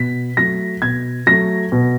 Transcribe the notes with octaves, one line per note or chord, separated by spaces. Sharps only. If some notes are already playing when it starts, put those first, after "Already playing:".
Already playing: B2 B6
F#3 A3 A#6
B2 G#6
F#3 A3 A#6
B2